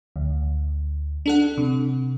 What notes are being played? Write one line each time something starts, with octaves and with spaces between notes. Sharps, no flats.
D2
D4 A4 F#5
C3